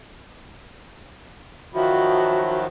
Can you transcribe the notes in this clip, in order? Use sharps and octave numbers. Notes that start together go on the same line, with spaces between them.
D#3 F3 F#3 F#4 E5 B5